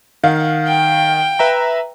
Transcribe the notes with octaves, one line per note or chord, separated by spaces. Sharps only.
D#3 F5 F#5
G5
B4 E5 A#5